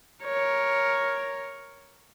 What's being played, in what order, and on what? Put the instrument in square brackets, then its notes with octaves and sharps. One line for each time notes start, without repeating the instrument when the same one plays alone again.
[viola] A#4 C#5